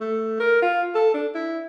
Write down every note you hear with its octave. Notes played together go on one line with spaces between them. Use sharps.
A3
A#4
F4
A4
D4
E4